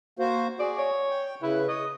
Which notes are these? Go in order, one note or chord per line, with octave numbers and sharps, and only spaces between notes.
A#3 F#4 C5
F#4 G#4 D5
C#5
G5
C#3 E4 B4
C#5 D#5